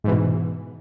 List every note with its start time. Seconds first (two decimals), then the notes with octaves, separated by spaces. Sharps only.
0.04 G#2
0.08 E3
0.11 B2